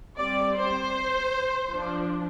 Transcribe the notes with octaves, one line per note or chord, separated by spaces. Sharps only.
G3 C4 D5
C5
F3 D4